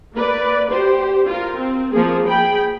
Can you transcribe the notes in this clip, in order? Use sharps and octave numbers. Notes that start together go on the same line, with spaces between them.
A#3 B4 D5
G4 C5
F4 A#4
C4
F3 A#3 G#4
G#4 G5 B5